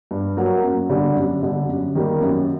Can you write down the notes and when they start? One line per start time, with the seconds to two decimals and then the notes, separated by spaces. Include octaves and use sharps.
0.11 G2
0.37 F#3 A#3 F#4
0.64 F#2
0.90 D3 G3 D4
1.15 F#2
1.42 D3 G3 D4
1.69 F#2
1.95 D#3 G3 A#3
2.21 F#2